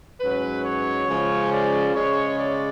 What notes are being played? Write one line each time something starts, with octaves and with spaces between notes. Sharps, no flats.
G#2 F#3 C#4 B4
C#5
C#3 F3 G#3 C#4
D5
C#3 G#3 C#4 C#5
D5